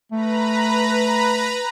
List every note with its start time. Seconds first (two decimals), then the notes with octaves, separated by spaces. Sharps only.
0.12 A3 B4 A#5 B5